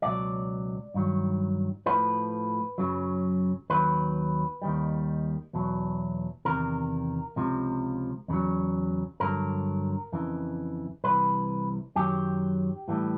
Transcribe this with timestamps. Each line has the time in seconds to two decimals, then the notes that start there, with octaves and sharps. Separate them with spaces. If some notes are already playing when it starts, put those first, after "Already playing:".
0.02 C#2 B2 F#3 D5
0.94 G2 D#3 F#3
1.86 A2 F3 B4
2.78 F#2 C#3 F#3
3.70 D#2 D#3 F#3 B4
4.62 D#2 D#3 G3
5.53 E2 B2 F#3
6.45 E2 C3 D#3 A#4
7.36 C#2 C3 F3
8.28 E2 C#3 F#3
9.20 G2 D3 F#3 A#4
10.12 F2 C#3 E3
11.04 C2 C3 E3 B4
11.96 F#2 D#3 F#3 G4
12.88 A2 E3 G3